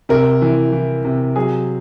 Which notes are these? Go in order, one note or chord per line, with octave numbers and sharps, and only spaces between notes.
C3 A#4
E3
E3
C3
F#3 G#4